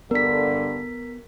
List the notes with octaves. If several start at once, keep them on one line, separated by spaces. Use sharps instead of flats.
G2 D3 B3 A#4 B6